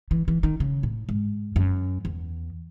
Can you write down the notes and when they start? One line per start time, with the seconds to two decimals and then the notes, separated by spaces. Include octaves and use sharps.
0.11 E3
0.28 E3
0.43 D#3
0.60 C#3
0.83 A2
1.09 G#2
1.56 F#2
2.05 E2